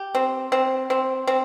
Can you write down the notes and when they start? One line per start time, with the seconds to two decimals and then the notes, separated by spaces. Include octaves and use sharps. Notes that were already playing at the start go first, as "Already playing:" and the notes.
Already playing: G4
0.15 C4
0.52 C4
0.90 C4
1.27 C4